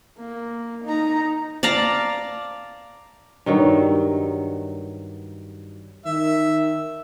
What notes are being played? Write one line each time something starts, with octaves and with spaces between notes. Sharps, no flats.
A#3
D#4 A#5
D5 F5 A5 A#5
G2 D#3 F#3
D#3 E5